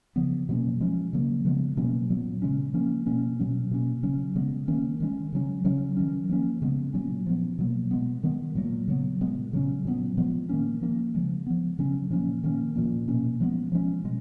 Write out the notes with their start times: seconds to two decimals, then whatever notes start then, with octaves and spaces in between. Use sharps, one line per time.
0.16 C#3 F3 B3
0.49 B2 F#3 A#3 C#4
0.81 F3 G#3 C#4
1.13 C#3 F#3 A#3
1.45 C#3 F3 G#3 B3
1.77 B2 F#3 A#3 C#4
2.10 A#2 F#3 B3
2.42 C#3 G#3 C#4
2.74 F3 A#3 C#4
3.06 B2 A#3 C#4
3.39 B2 F#3 C#4
3.71 B2 A#3 C#4
4.03 C#3 F#3 C#4
4.35 C#3 G#3 B3
4.68 D#3 A#3 C#4
5.00 D#3 G#3 C#4
5.33 C#3 F#3 C#4
5.64 C#3 F#3 C#4
5.97 D#3 F#3 C#4
6.29 F3 A#3 C#4
6.62 C#3 G#3 B3
6.94 A#2 F#3 A#3 C#4
7.26 F3 B3
7.59 B2 F#3 A#3
7.91 B2 G#3 B3
8.23 D#3 G#3 B3
8.55 A#2 F#3 A#3
8.88 C#3 F#3 B3
9.21 A#2 G#3 B3
9.53 C#3 F#3 C#4
9.85 A#2 F#3 B3
10.17 A#2 F3 G#3 B3
10.49 D#3 A#3 C#4
10.81 F3 A#3 C#4
11.15 C#3 F3 G#3
11.46 F3 B3
11.79 C#3 F#3 C#4
12.10 A#2 F3 A#3 C#4
12.44 D#3 A#3 C#4
12.76 A#2 F3 A#3
13.08 B2 A#3 C#4
13.40 F3 G#3 B3
13.72 F3 G#3 C#4
14.04 B2 G#3